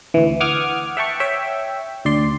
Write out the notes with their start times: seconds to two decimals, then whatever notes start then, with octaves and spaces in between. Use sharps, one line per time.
0.14 D2 E3
0.40 F#5 D6 D#6 F6 G#6
0.97 E5 F#5 G5 A5 C#6
1.20 C#5 E5 G5
2.05 D2 D5 C6